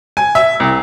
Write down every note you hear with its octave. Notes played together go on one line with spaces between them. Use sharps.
G#5
E5
C2